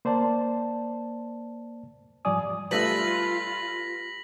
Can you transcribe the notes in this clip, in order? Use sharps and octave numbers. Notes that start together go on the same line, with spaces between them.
A#3 C5 D5 A5
G#2 F3 G3 D5 G#5 D#6
G3 A3 F4 B4 E5 A#6 B6 F#7